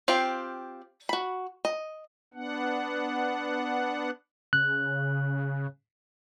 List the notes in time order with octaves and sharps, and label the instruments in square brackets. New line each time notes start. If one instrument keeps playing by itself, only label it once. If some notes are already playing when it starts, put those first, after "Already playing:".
[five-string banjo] C4 F4 G4 F5
F#4 B5
D#5
[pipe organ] B3 D4 F#5
[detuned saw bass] C#3 [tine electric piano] F#6